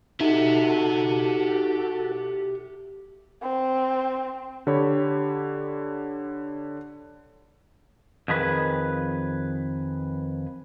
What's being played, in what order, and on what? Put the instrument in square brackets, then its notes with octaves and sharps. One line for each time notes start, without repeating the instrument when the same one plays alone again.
[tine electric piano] D#4 [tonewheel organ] F#4 A4 [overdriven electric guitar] G4 E5
[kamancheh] C4
[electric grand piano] D3 G4 C#5 B5
[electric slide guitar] F2 D#3 G#4 B4